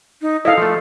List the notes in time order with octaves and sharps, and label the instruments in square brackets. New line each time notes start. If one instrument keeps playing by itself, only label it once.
[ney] D#4
[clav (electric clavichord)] E4 [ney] A4 [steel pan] D#5 F5
[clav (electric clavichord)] F3 A3